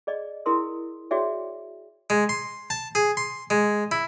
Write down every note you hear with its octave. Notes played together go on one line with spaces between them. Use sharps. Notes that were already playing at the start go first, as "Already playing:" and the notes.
G#4 D5 D#5
E4 G#4 A#4 C6 D#6
F#4 G#4 C#5 D5 E5 G5
G#3
C6
A5
G#4
C6
G#3
E4